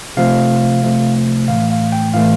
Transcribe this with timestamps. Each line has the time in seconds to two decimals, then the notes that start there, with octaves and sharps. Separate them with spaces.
0.17 C3 F3 A3 F5
0.82 C3 F3 A3
1.48 A2 E3 A3 F5
1.70 F5
1.92 G5
2.14 A2 E3 A3 F5